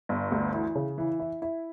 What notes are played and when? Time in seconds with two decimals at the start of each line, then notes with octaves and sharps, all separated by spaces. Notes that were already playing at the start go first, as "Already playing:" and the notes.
0.09 G1
0.32 D2
0.54 E3
0.75 C#3
0.98 E3
1.20 E4
1.42 E4